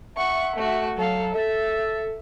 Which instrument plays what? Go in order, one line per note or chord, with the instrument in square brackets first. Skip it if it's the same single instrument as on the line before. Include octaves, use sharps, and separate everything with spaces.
[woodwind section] E5 [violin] F#5 C#6
[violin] A3 F#4
[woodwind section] F#3 [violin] A4 F5
[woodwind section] A4 [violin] E5